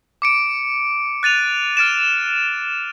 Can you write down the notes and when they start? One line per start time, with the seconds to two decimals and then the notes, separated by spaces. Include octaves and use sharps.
0.22 D6 C#7 D7
1.23 F#6 A6 D#7 F7
1.77 F6 A6 D7 E7